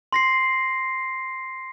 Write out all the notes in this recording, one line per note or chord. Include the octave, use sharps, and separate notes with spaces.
C6 A#6 C7